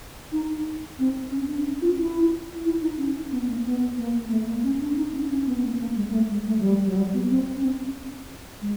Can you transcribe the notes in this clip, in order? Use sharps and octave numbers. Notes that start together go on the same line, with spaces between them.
D#4
C4
C#4
D4
C#4
F4
E4
E4
D#4
C#4
B3
A#3
B3
A#3
A#3
A3
A#3
C#4
D4
D#4
C#4
C#4
B3
A#3
B3
A#3
G#3
A#3
A3
G#3
A3
F#3
G3
F#3
G3
B3
C4
C#4
C4
G#3